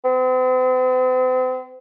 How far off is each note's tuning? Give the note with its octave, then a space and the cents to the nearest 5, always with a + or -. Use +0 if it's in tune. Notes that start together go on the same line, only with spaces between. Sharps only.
C4 -40